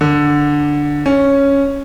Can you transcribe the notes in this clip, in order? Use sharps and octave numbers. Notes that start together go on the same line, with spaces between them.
D3
C#4